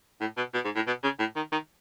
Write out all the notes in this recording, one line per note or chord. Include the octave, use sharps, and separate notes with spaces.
A2
B2
B2
G#2
A2
B2
C#3
A2
D#3
D#3